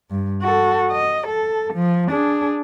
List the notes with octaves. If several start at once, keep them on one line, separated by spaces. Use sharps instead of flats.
G2
F#4 A4
D#5
A4
F3
D4 G#4